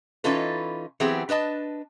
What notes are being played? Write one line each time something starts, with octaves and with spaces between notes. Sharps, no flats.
E3 C#4 D#4 F4 A4 B4
E3 F#3 B3 C4 G4 G#4
D4 B4 D#5 A5